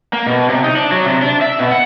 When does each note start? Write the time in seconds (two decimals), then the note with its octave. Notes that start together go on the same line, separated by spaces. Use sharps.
0.13 A#3
0.27 B2
0.49 C3
0.64 D#4
0.76 D4
0.91 F#3
1.06 C3
1.22 D4
1.41 E5
1.59 B2
1.72 F#5